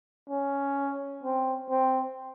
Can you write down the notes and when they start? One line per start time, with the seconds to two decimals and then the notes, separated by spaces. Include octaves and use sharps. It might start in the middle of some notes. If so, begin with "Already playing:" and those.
0.29 C#4
1.24 C4
1.70 C4